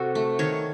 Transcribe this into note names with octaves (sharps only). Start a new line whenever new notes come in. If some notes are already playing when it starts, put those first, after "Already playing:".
Already playing: C3 F#4 A4
A3
D#3 C#5